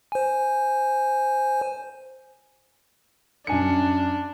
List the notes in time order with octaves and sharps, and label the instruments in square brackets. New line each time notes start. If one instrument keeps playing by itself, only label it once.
[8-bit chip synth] C5 G#5
[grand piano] F#2 G#5 C#7 [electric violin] D4